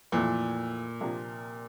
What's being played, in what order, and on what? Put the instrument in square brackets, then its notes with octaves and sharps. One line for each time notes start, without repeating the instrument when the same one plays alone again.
[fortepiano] F2 E3 A3 [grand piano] A#2
[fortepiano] C3 F3 A#3 D4